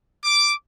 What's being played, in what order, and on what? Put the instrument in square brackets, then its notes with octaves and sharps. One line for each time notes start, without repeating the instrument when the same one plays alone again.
[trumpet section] D6